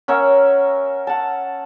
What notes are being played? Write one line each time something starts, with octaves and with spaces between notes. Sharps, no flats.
C#4 A#4 E5 F#5
F#5 A5